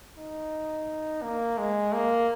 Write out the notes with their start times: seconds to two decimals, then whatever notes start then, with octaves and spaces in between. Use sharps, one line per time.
0.18 D#4
1.23 A#3
1.58 G#3
1.93 A#3